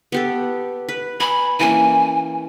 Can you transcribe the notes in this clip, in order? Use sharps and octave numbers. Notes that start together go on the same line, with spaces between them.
B3 G4 A4
B4
G#5 B5
E3 A#3 C#4 G#5